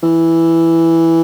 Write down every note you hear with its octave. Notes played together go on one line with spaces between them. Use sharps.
E3